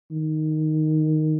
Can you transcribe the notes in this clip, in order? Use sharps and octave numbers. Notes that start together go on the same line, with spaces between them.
D#3